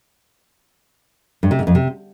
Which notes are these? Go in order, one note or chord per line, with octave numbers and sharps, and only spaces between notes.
G2
C3
G#2
F2
C3